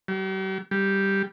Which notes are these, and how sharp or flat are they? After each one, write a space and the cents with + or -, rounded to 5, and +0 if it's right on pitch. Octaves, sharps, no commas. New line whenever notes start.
G3 -45
G3 +0